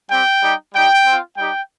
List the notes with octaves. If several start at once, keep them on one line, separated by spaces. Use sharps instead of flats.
G3 C4 G4 G5
G3 D#4 G4
G3 D#4 G4 G5
C4 F4
G3 D#4 G4 G5